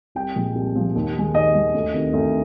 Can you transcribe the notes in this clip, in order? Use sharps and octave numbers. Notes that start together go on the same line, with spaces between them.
C2 G5
A#2 F3 G#3
C2
A#2 F3 G#3
D#2
D#3 G#3
D#2 D#5
D#3 G#3
D2
C3 D#3
D2